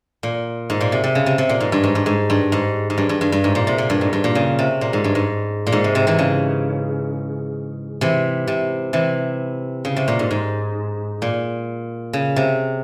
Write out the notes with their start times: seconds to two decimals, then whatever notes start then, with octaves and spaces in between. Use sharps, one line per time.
0.23 A#2
0.70 G#2
0.81 A#2
0.92 C3
1.04 C3
1.15 C#3
1.26 C3
1.38 C3
1.49 A#2
1.60 G#2
1.72 G2
1.84 G#2
1.95 G2
2.06 G#2
2.30 G2
2.52 G#2
2.90 G#2
2.98 G2
3.09 G2
3.21 G2
3.32 G2
3.44 G#2
3.55 A#2
3.67 C3
3.78 A#2
3.90 G2
4.01 G#2
4.13 G2
4.24 A#2
4.35 C#3
4.59 C3
4.81 A#2
4.93 G#2
5.04 G2
5.15 G#2
5.67 A#2
5.72 G#2
5.84 C3
5.95 C3
6.07 C3 E3
6.19 C#3
8.01 C3 E3
8.47 C3
8.93 C3 E3
9.85 C#3
9.97 C3
10.08 A#2
10.19 G#2
10.31 G#2
11.22 A#2
12.13 C#3
12.36 C3